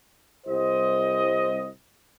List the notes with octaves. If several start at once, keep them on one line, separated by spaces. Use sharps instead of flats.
C2 C5 D#5